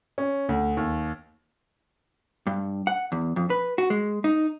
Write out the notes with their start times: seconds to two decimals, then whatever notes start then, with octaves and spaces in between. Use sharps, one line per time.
0.18 C#4
0.49 D2
0.77 D#2
2.47 G2
2.87 F#5
3.12 E2
3.36 F2
3.50 B4
3.78 F#4
3.90 G#3
4.24 D#4